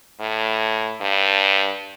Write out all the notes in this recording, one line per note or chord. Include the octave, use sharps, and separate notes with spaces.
A2
G2